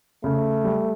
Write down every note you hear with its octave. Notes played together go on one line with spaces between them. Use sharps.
C#3 A3
G3